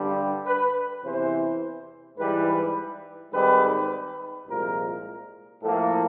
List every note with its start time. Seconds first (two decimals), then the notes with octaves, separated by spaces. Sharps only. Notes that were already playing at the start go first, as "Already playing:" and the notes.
Already playing: G2 D3 G3
0.46 B4
1.03 E2 C3 E3 C5
2.18 G#2 E3 G3 B4
3.33 G#2 D#3 G3 C4 B4
4.47 C2 A#2 F3 G#3 A#4
5.62 A2 F3 A#3 A4